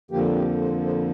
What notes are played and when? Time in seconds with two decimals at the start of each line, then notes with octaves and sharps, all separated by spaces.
0.11 F2 D3 F3 A#3 G4
0.36 G4
0.61 C5
0.86 C5